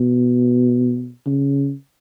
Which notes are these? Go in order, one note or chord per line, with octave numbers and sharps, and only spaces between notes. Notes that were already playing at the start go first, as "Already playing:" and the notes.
Already playing: B2
C#3